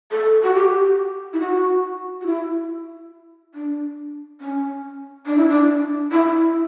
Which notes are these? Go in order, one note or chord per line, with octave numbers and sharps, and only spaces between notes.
A4
F#4
G4
E4
F#4
F#4
E4
D4
C#4
D4
E4
D4
E4